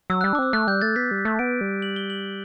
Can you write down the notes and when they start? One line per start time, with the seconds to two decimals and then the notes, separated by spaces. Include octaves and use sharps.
0.10 F#3 E6
0.21 F#6
0.24 G3
0.33 D4 D6
0.39 C4 E6
0.53 A3 F#6
0.67 G3 G6
0.81 A3 A6
0.96 B3 B6
1.11 G3
1.18 B6
1.25 A3
1.39 B3 D7
1.61 G3
1.82 F#7
1.96 G7
2.10 F#7